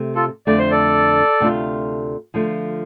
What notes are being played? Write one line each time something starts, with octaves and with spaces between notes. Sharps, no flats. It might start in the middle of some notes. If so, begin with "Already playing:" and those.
Already playing: C3 A3
F4 A4
F2 D3 A3 D5
C5
A4 D5
D2 C3 A3 D4 F4
D3 F3 A3 F4